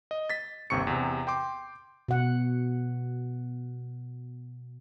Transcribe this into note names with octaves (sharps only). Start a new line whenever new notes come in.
D#5
A6 B6
G1 D#2 C3 C#6 C#7
E2 C3
G5 C6 D6
B2 F#5